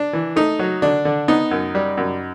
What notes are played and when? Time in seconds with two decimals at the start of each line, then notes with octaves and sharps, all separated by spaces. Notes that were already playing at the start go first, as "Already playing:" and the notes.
Already playing: D4
0.13 E3
0.36 A3 D#4
0.59 F#3
0.82 D3 D4
1.05 D3
1.28 B3 D#4
1.51 F#2
1.75 G3
1.97 F#2